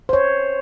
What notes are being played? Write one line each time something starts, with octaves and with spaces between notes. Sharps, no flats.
C5
C#5